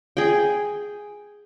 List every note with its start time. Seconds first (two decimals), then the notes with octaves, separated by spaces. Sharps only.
0.17 G#4 G5